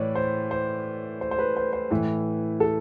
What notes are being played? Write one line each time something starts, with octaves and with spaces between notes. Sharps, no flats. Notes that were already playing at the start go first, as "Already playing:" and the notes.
Already playing: A2 E3 B4 C#5 D5
C5
C5
C5
C5
B4
C5
C5
A2 E3 B4
A4